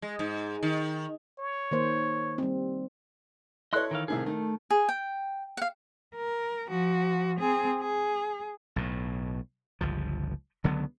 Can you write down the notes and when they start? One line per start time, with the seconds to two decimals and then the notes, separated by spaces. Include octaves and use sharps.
0.02 G#3
0.19 G#2
0.63 D#3
1.39 C#5
1.71 D#3 A#3 C5
2.38 G3 C4
3.73 E4 A4 C#5 D#5 C6 F#6
3.91 D#3 E3 F5
4.08 C2 A2 D#3 G#4
4.26 D#3 A3
4.70 G#4
4.89 G5
5.57 F5 F#5
6.16 A#4
6.68 F3 F#4
7.40 C4 G#4
7.79 G#4
8.76 B1 A2
9.81 G1 C#2 F3
10.64 C#2 D3 F#3 B3